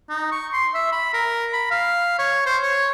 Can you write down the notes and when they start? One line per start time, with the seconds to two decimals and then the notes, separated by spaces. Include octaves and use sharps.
0.09 D#4
0.32 C#6
0.53 C6
0.75 E5
0.92 B5
1.14 A#4
1.53 B5
1.71 F5
2.19 C#5
2.46 C5
2.63 C#5